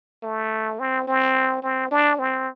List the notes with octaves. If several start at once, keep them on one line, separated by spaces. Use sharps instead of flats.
A3
C4
C4
C4
D4
C4